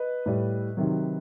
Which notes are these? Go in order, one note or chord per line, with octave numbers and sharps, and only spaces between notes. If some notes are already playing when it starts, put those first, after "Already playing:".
Already playing: B4 D#5
A2 G3
C3 D#3 F#3